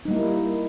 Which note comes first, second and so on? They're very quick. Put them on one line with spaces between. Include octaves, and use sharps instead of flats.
D#4 G3 A#3 E4